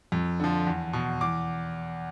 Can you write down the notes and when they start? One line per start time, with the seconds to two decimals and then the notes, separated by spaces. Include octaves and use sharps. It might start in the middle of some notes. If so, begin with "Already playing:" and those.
0.12 F2
0.40 D3 F3
0.67 E2
0.93 B2
1.21 E2 D6